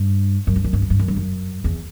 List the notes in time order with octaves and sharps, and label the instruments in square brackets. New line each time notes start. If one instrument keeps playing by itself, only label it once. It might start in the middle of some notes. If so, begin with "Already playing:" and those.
Already playing: [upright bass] G2
F#2
G2
F#2
G2
F#2
G2
F#2
G2
F#2
E2